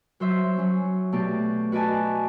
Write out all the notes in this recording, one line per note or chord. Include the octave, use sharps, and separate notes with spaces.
F#3 C5 E5
F#3 C#4
B2 A3 G4 D5
F#4 B4 D5 D#5 G#5 A5